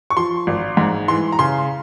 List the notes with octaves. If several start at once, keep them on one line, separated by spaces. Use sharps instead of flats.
C#6
F3 C6
G#1
G#2
E3 C6
A#5
C#3 C6